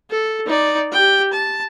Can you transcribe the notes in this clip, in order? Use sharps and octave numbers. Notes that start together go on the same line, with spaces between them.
A4
D#4 D5
G4 G5
A5